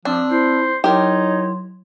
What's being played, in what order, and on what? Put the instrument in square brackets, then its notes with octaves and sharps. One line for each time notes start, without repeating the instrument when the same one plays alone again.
[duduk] F3 [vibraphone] C4 E6 [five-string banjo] D4
[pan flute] E4 [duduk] C5
[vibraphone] F#3 E4 C6 [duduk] D#4 [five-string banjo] G4 A#4 [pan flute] C#5